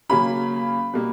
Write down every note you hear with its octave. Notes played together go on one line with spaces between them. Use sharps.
C#3 F#3 A#3 C#4 B5
B2 G3 A#3